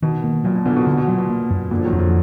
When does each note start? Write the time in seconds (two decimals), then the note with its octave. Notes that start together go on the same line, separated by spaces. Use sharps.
0.02 B2 D#3
0.24 A#3
0.44 A#2 F#3
0.55 B2
0.66 A#2 D3 B3
0.76 B2 D#3
0.87 B2 D3
0.97 B2
1.08 A#2 F#3
1.18 B2
1.29 A#3
1.50 F#2
1.71 A#2 D3 A#3
1.79 F3
1.85 D#3 F#3
1.92 F2
1.99 D3 F3